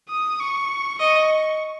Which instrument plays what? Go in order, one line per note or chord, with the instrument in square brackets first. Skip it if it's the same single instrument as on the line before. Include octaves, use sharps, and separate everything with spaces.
[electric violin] D#6
C#6
[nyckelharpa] D#5 [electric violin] C#6